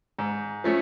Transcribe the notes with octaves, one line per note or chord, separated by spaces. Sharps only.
G#2
F3 A3 C#4